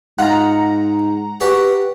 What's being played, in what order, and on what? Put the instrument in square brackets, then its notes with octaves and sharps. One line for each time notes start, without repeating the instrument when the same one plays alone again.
[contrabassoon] G#2 [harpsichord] D#4 F4 [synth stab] F#5 A#5
[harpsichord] F#4 G4 D5 [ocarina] B4